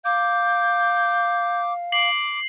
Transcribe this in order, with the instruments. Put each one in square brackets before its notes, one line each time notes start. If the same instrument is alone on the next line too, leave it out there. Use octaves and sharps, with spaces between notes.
[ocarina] F5 [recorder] D6 [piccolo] G6
[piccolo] D6 [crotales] C7 F#7